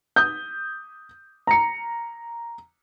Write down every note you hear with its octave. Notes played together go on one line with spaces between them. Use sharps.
D#6 G6
A#5 C#7